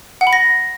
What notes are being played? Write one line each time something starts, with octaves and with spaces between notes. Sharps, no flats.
F#5
B5
A#6